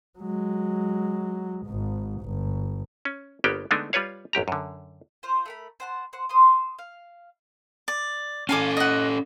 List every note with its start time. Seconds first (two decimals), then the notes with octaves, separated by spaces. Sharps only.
0.19 F#3 G#3
1.66 G#1 G#2
2.21 G1
3.05 C#4
3.44 G1 A#3 B3 G4 G5
3.71 D3 G#3 A3 B3 D4 D#4
3.93 G3 F4 B4 C#5 F5
4.33 A1 F#2 G4 A#5
4.48 F#2 D3
5.23 F4 C5
5.46 A3 A#4 B5
5.80 C5 F#5 A5
6.13 C5 F#5
6.29 C5 C6 D#6
6.79 F5
7.88 D5
8.49 C#4 A4 F5 G#5 D6
8.77 D#5 F#5